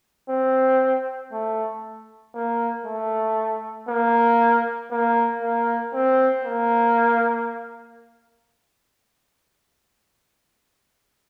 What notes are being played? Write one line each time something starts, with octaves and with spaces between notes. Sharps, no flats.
C4
A3
A#3
A3
A#3
A#3
A#3
C4
A#3